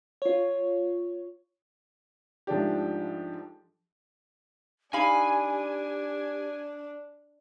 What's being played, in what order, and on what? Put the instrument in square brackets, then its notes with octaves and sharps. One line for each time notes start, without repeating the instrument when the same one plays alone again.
[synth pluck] F4 C#5
[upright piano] G#2 F3 A3 D4 G4
[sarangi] D4 [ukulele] D#4 F5 B5 [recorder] G4 [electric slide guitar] G#5